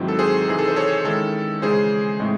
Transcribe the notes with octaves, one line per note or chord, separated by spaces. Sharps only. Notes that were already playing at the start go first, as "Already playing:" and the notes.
Already playing: G#2 D#3 F#3 C4 E4
A4
G#4 C5
C3 E3 C4 D#4 G#4
A4
C5
A4 C#5
D#3 G#3 C#4 E4 A4
C#3 E3 G#3 C#4 G#4 C5
A2 G#3 C4 D#4